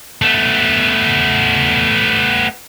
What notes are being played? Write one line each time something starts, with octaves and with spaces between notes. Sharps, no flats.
A3 B3